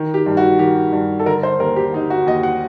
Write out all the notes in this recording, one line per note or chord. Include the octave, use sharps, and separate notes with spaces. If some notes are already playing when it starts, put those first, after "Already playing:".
Already playing: D#3
G4
G2
F#4
D#3 G4
G2
A4
D3 A#4
C5
D#2 A#4
G4
D3 D#4
F#4
D#2 D#5
F#5